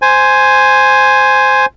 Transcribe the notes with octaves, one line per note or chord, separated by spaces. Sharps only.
C5 G#5